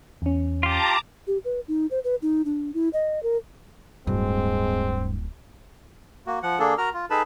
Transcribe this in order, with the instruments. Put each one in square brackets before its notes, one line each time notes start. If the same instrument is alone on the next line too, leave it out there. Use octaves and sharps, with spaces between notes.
[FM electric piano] E2 C#4
[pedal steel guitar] F4 G4 [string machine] A5 A#5 D6
[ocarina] G4
B4
D#4
C5
B4
D#4
D4
E4
D#5
A#4
[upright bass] D1 [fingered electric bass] G2 [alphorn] G#3 [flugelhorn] C4
[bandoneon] A#3 F#4
F3 F#5
D3 A#3 D4 G#4 A4
F#4 A#4 A#5 F6
F4
D#4 G#4 A4 B4 A5 B5